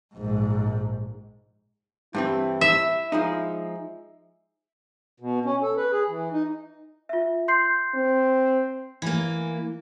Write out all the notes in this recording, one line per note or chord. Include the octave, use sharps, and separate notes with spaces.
A#1 G#2
G2 E3 C4 E4
E5
F3 G#3 D#4
B2
C#4
A4
B4
G#4
E3
D#4
F4 E5
C6 G6 C7
C4
E3 A#3